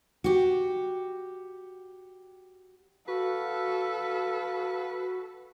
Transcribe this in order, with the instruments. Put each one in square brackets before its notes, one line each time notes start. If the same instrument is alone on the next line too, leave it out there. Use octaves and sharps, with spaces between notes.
[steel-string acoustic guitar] F#4 G4
[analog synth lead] F#4 [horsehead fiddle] A4 [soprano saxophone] B4 [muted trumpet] F5